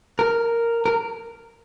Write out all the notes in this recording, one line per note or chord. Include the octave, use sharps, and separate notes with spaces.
A#4
A#4